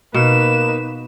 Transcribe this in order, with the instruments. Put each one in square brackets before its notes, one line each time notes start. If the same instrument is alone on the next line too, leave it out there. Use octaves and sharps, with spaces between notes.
[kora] B2 [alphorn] A#3 [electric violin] D#4 B4 [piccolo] E7